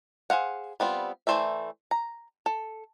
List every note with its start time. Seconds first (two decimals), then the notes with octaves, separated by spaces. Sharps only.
0.30 G#4 C5 F5 F#5
0.80 G3 B3 C4 F4
1.27 E3 A3 C5 D5 E5
1.91 A#5
2.46 A4